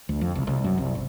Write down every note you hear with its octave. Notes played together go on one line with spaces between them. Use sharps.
D2
F2
C2
C2
F#2
C2
G1